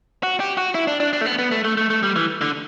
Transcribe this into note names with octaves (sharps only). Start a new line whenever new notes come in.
F#4
G4
F#4
E4
D4
D4
D4
A3
B3
B3
A3
A3
A3
A3
G3
E3
D3